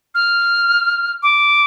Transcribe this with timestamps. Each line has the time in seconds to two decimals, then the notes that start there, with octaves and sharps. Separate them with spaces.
0.15 F6
1.23 D6